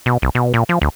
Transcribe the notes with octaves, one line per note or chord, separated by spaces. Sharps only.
B2
C2
B2
A#2
F3
D2